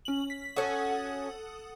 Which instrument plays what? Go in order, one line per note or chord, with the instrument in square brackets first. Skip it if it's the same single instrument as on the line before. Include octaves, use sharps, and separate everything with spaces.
[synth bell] C#4 F#7
B6
[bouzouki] C#4 F#4 [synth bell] A4 F#5 D#6